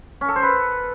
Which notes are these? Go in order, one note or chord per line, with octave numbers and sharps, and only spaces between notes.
C#4
A4
C5
B4